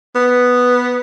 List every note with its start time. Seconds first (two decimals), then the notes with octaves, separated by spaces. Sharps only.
0.15 B3